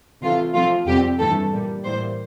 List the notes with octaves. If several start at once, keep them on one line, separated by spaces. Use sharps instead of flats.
C3 E3 A3 C4 F4
C3 F3 A3 C4 F4
F2 C3 G3 C4 G4
G2 E3 A3 A4
A#2 G3 A#3
A2 E3 G3 A#3 C5